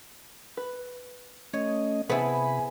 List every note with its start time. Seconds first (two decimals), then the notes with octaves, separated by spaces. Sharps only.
0.57 B4
1.53 A3 C#4 C#5 D#5
2.09 C3 B3 E4 G#4 C5 G#5 A5 B5